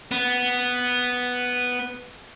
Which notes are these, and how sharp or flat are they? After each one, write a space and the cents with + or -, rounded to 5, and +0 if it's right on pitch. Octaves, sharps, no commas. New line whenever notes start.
B3 +0